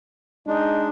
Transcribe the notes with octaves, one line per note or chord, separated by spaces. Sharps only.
G#3 D4 D#4